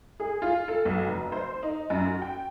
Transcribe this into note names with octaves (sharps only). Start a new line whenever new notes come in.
G#4
F4
A4
B1
F1
C5
D#4
F#2
F#4
G5